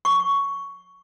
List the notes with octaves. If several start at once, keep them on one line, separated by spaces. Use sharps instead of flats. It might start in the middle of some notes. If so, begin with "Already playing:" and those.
C#6